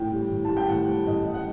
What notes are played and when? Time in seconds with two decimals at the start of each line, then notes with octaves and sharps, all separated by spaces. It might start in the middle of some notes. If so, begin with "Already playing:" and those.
Already playing: A2 G5
0.12 G3
0.31 A2
0.45 G3 A5
0.57 G5
0.68 A2 F#5
0.88 G3
1.06 A2 D#5
1.25 G3 D#5
1.34 F#5